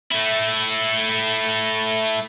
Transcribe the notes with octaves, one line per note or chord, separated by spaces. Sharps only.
A3 E4